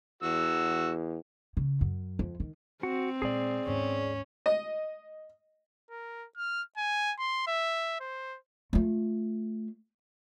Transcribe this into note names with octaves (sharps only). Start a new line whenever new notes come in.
E2 F#4 E6
C#3
F#2
F2
D#3
C4 F#4
A#2 G#3 G#4 D5
D#2 G#2 C#4
D#5
A#4
F6
G#5
C6
E5
C5
A3 F4